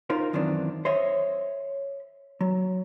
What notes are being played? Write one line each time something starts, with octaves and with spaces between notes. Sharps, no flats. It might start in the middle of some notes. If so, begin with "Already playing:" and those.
D#4 F4 A#4 C5
F#2 D#3 E3 C4 D4
C5 C#5 D#5 E5
F#3